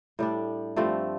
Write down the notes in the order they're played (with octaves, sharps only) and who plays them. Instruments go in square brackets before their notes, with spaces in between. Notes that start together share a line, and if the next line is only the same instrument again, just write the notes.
[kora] A2 G3 D4
G2 F3 A3 C4